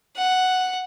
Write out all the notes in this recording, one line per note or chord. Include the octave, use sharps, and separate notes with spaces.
F#5